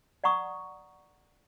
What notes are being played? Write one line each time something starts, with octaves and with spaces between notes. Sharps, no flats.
D5 F#5 A#5 C#6 D#6